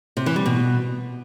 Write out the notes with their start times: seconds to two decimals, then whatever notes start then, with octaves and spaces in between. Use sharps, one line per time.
0.17 C3
0.26 E3
0.36 G3
0.46 B2